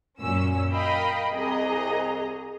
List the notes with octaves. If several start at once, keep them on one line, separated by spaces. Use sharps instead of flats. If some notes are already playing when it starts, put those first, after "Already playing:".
F#2 A#2 C#4 E6
A#4 D#5 F5 G5 B5
C2 G#4 D#5 A#5